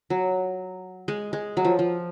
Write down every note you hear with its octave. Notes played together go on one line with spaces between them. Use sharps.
F#3
G#3
G#3
F#3
F3
F3